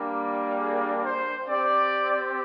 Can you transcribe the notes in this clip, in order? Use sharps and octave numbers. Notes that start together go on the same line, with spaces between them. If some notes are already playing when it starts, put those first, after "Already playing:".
Already playing: G3 A#3 D4
G#4
C5
C4 G4 D5